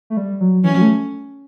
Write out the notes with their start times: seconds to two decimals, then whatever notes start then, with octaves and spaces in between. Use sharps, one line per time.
0.10 A3
0.17 G3
0.41 F#3
0.64 E3 C#4
0.77 F#3
0.82 A3